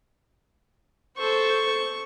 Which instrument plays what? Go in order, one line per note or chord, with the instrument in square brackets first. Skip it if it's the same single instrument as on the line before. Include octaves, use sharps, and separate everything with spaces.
[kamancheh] A4 C5 [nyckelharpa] C#6